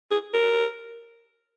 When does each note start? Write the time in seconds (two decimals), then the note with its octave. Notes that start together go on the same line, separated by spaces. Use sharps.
0.11 G#4
0.34 A#4